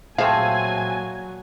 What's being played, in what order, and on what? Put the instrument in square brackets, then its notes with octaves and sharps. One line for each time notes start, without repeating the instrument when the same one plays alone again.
[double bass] A#2 F#3 [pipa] F3 A3 C4 [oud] G#4 F5 [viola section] G#5